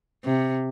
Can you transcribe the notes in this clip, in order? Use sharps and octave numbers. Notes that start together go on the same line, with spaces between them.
C3